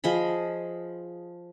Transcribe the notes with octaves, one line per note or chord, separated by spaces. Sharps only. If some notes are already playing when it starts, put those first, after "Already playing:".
F3 G#4 D#5 B5